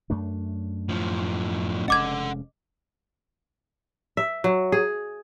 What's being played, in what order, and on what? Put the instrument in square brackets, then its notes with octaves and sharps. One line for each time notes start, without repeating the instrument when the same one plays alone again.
[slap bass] F#2 A3 D4
[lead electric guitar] A2 F3
[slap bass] F1 G#3 C#4 [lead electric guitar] A4 F#5 [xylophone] D#5 D6 G#6
[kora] E5
F#3
G#4